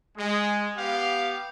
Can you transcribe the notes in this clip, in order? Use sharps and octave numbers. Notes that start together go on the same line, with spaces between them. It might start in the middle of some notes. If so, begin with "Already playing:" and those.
G#3
B3 G4 F5